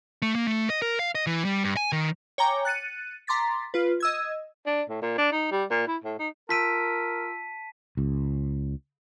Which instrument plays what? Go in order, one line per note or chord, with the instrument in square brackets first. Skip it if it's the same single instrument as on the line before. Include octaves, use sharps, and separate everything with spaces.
[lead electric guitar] A3
A#3
A3
D#5
A#4
F5
D#5
E3
G3
G2
G#5
D#3
[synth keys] C#5 G5 G#5 A#5 D6
F#6 A6 C#7 D#7
A#5 C6 D6 A6 B6
F4 B4
D#5 E6 G#6
[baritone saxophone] D4
A2
A#2
D4
D#4
G3
A#2
E4
A2
D#4
[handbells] F4 E6 D7 [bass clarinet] A#4 [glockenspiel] A5 B6 D#7
[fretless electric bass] C#2